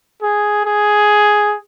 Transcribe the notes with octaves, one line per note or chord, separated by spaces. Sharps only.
G#4
G#4